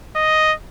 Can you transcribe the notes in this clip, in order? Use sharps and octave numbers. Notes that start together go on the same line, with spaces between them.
D#5